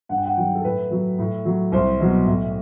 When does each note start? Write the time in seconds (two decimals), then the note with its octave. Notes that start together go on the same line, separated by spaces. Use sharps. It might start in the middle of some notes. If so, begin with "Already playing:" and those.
0.09 G2 F#5
0.17 G5
0.26 F#5
0.37 D#3 F#3 G5
0.55 A4
0.64 A2 B4
0.91 F#3
1.19 A2
1.45 F#3
1.72 C2 C5
2.00 B2 F#3
2.26 A2